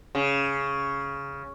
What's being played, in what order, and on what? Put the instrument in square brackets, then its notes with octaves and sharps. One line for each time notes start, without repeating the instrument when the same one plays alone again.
[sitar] C#3